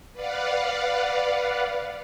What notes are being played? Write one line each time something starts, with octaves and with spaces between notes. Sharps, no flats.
B4 D5 F5 F#5